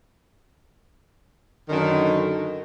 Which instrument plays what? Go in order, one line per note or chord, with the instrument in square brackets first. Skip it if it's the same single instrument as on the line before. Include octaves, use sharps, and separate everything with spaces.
[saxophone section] F#2 D3 D#3